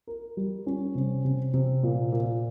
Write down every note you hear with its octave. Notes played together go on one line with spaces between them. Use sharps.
A#4
G3
C#4
C3
C3
C3
A#2
A#2